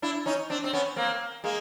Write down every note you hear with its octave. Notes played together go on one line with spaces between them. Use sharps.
D4 E4
C#4 D#4
C4 D4
C4
B3 C#4
A#3 C4
G#3 A#3